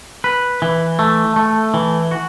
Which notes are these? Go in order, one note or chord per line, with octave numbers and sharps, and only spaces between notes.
B4
E3
A3
A3
E3
F#4